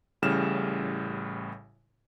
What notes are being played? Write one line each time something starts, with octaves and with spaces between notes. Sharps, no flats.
A1 A2 C#3 G3 F6 E7